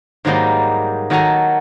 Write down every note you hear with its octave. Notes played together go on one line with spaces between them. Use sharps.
G#2 D#3 F#3 G3 A#3 D#4
D#3 F#3 F#4 A4 G#5 A#5